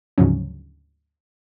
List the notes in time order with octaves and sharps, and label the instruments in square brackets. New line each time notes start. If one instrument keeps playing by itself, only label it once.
[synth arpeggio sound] D2 G#2 C#3 F3 F#3 C#4